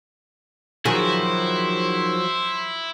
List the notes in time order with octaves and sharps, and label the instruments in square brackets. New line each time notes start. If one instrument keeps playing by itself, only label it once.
[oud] D#3 G#4 [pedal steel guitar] F3 F#3 F#4 [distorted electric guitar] E4 [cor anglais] C5